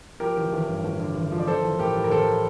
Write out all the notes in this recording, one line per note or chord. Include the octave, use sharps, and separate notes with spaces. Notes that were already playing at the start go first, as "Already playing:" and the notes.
F3 G4 A#4
A1
A1
G2
A1
D3
A1
F3
D5
F3 A4 C5
A1
A2 G4 A#4
A2
A#4
A1 A4 C5